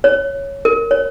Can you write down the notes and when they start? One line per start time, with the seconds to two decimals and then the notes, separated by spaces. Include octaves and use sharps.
0.04 C#5
0.65 A#4
0.91 C#5